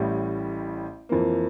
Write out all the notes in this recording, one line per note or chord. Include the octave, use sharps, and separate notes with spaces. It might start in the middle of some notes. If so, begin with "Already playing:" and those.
Already playing: A1 A2 G3
F2 E3 A#3